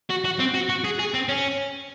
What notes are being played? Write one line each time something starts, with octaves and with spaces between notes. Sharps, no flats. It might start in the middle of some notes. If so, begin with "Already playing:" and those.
F#4
F#4
C4
F#4
F#4
G#4
G#4
C4
C#4